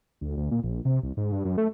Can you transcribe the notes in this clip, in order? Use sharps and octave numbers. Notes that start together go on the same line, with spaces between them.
D2
D2
A#2
A#1
C3
C2
G#2
G2
F#2
A3